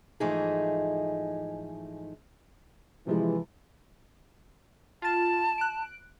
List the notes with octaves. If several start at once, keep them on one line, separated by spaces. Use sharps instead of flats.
G#2 E3 F3 A3 D#4 G#4
C3 E3 F3 G#3
F4 A5 A6
F#6 D7